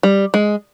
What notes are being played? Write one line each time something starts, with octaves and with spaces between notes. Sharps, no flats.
G3
G#3